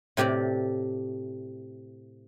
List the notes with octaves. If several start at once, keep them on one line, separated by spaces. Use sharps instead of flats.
A2 C3 G4 D5